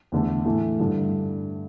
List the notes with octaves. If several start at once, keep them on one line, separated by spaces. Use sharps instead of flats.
E2 D3 A3
A2 E3 A3
G2 D3 A3 E4 A4